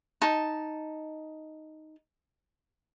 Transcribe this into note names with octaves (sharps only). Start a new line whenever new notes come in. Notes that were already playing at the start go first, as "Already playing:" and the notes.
D#4 A5